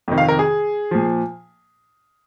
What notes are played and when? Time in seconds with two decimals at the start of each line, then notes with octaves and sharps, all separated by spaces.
0.08 F2 C3 D#3
0.18 F5
0.28 A#4
0.39 G#4
0.91 A#2 F3